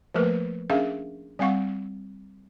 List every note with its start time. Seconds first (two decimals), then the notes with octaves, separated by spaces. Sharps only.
0.14 F3 A3 A#3 A#4 B4
0.70 C#4 D4 G#4 A#4 E5 F5
1.39 G3 C4 F5 F#5 C#6